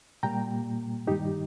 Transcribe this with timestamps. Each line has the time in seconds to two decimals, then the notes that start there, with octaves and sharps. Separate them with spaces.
0.23 A#2 G3 A#3 G5 A#5
1.07 G2 D#3 G3 D#4 G4